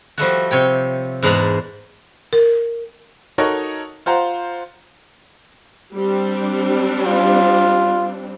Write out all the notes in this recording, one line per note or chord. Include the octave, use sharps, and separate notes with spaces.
F3 G3 A3 F#4
C3 C#5 G5
E2 G#2 D4 A#5 B5
A#4
D#4 F#4 A4 A#4 C#5 D#5
F4 C5 F#5 A#5
G3 C4 D4
F4